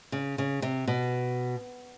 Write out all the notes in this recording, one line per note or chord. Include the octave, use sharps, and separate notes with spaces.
C#3
C#3
C3
B2